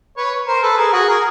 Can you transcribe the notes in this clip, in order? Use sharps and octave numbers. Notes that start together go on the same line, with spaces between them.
B4 C#5
A#4 C5
A4 B4
G#4 A#4
F#4 G#4
G#4 A#4